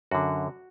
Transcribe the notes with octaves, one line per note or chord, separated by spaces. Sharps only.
F#2 D3 F#4